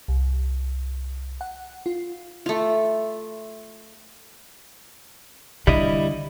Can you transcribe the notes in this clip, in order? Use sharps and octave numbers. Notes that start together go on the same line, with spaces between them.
C2
F#5
F4
A3 F4
D3 G3 E4 D#5